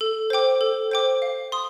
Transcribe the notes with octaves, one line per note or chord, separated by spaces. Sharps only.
A4
C5 G5 D6
A4
C5 G5 D6
F5
C6 D#6